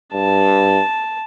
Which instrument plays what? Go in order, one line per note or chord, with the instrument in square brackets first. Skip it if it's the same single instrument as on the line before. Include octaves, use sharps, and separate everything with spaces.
[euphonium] G2 [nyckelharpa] A5